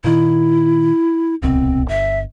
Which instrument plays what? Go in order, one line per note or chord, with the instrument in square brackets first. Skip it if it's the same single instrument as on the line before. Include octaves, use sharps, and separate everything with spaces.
[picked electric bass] A#2 D#3 [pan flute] E4
[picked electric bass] D1 C2 B2 [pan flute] C4
[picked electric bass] G1 [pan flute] E5